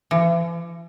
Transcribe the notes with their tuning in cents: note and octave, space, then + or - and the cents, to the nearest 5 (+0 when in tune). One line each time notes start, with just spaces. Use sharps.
E3 +45